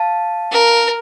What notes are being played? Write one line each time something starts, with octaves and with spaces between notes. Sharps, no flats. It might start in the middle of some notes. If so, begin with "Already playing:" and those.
Already playing: F5 A5
A#4